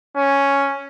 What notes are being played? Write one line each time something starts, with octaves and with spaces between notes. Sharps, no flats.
C#4